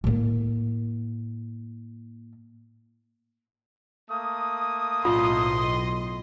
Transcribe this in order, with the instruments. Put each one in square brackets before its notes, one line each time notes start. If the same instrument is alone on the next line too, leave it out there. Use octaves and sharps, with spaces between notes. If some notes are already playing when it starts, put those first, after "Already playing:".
[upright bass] A2 A#3
[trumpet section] A3 A#3 D#6
[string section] B1 A2 D#5 [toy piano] F4 [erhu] C6